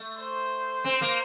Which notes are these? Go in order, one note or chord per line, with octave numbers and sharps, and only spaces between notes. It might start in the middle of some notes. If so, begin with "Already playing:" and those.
Already playing: A3
C5
C4
A#3